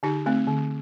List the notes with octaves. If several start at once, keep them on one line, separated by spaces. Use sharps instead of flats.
D3 D#4 G4
A3 C4
D3